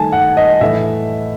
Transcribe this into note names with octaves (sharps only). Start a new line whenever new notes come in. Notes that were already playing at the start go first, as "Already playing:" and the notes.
Already playing: D#3 A3 G#5 A5
F#5
D#5
A2 E3 A3 E5